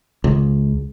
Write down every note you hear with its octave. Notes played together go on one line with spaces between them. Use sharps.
C#2